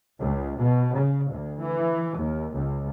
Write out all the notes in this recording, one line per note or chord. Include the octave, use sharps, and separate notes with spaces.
C#2
B2
C#3
D2
E3
D#2
C#2